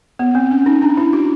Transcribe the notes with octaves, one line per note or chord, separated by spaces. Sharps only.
B3
C4
C#4
D#4
D4
E4
F#4